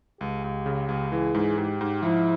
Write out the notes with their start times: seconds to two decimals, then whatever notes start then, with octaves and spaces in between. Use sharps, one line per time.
0.21 C#2 G4
0.44 C#2
0.66 C#3
0.89 C#2
1.12 E3 G#4
1.35 G#2
1.58 G#2 G4
1.81 G#2
2.02 F3 E4